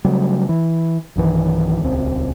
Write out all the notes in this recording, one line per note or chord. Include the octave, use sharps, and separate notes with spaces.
C#3 F#3 G3 A3
E3
B1 G2 D#3 E3
D#1 C#2 C4